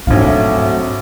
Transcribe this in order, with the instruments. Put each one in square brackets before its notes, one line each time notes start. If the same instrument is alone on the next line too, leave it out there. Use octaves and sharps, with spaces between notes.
[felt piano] A#1 F5 [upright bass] G#2 C4 [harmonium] F#3 A3